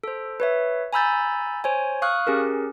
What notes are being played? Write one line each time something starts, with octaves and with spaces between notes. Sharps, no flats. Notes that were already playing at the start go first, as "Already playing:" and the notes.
A4 C5
B4 C#5 E5
G#5 A#5 B5 E6 G6 A6
C5 C#5 G#5
F5 C#6 D#6 F6 F#6
C#4 G4 G#4 A#4